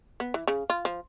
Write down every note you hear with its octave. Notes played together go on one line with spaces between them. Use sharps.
B3
E3
C#3
F4
F3